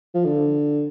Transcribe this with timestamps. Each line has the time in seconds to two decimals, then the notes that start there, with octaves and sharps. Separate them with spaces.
0.14 F3
0.25 D3